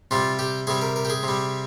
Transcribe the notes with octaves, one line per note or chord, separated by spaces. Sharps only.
C3 G3 F4
G4
C3 G3 G#4
A#4
A#4
G4
G#4
C3
G3